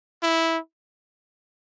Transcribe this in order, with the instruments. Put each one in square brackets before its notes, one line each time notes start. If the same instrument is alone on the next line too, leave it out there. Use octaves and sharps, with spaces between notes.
[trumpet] E4